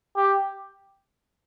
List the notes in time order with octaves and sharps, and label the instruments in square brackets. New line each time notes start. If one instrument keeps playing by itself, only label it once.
[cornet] G4